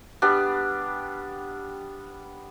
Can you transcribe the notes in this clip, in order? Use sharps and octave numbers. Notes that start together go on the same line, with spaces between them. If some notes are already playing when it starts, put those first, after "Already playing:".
G3 B3 D4